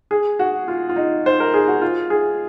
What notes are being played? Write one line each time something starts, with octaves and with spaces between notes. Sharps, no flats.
G#4
F#4
F4
F4
D#4
C5
A#4
G#4
F#4
F4
G#4